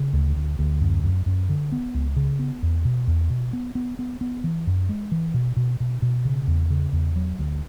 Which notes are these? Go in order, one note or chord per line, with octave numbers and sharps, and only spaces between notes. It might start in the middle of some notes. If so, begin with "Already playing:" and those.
Already playing: C#3
D2
D2
D2
F#2
F#2
F#2
D3
B3
C#2
C#3
B3
E2
B2
E2
B2
B3
B3
B3
B3
E3
F#2
G#3
E3
B2
B2
B2
B2
C#3
E2
C#3
E2
F#3
D2